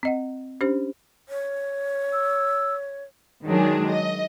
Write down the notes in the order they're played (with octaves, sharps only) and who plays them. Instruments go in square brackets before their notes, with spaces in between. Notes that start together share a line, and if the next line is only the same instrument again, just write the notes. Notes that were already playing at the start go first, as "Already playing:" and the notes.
[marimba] C4 D#5 F#5
C#4 D4 G4 C5
[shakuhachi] C#5
[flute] E6
[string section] D#3 F#3 G#3 D4 G#4
D#5